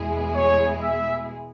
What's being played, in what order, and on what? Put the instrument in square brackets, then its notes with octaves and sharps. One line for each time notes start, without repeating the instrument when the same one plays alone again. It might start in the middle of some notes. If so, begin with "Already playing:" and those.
Already playing: [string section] E2 B2 G#3 E4 G#4
[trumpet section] C#5
E5